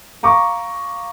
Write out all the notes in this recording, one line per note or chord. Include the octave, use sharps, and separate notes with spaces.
F5 A#5 C#6 D6